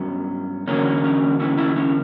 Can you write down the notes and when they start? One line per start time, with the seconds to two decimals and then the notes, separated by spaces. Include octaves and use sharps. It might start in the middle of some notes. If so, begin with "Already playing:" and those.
Already playing: G2 F#3 B3 C#4
0.67 E2 D3 F#3 A#3 C#4
1.04 C#4
1.40 C#4 E4
1.57 C#4 E4
1.76 C#4 E4